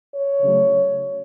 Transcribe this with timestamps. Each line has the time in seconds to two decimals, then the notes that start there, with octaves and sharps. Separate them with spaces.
0.13 C#5
0.41 C#3 F#3 A3